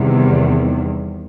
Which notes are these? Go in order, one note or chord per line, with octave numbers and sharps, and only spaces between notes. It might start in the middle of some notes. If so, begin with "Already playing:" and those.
Already playing: E2 C3 D#3 G3